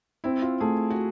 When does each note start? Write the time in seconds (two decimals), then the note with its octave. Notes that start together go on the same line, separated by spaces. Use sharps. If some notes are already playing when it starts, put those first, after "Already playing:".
0.24 C4 E4
0.42 F4
0.60 A3 G#4
0.90 F#4